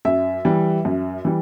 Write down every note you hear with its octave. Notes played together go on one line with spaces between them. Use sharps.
F#2 E5
E3 G3
F#2
E3 G3